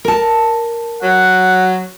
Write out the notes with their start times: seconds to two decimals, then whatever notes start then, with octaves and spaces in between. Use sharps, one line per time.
0.05 A#4 A5
1.03 F#3 F#5